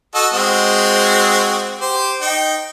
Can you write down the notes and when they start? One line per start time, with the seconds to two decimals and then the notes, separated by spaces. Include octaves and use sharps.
0.15 F#4 A4 D#5
0.34 G#3 C4 F#4
1.81 G4 C5
2.21 D#4 G5